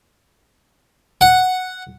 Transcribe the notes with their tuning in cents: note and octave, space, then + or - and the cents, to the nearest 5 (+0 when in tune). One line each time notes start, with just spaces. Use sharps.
F#5 +0